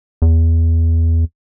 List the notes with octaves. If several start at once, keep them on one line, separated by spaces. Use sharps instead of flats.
E2